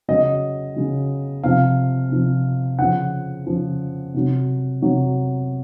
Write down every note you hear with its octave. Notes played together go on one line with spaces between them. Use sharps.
C#3 F#3 D#5
C#3 F#3
C3 F3 F5
C3 F3
C#3 F3 F#5
C#3 F3
C3 F#3
C3 F#3